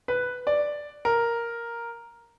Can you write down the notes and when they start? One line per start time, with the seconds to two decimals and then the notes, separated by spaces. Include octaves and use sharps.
0.08 B4
0.47 D5
1.05 A#4